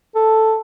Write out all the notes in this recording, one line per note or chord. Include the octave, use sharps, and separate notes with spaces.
A4